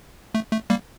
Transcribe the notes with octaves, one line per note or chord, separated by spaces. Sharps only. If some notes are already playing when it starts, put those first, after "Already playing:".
A3
A3
G3 A#3